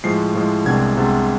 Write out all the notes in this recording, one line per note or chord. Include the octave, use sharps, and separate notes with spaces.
A2 F3 G#3 C7
A2 F3 G#3
C2 C3 G#3 B3 D4 G#6
C2 C3 G#3 B3 D4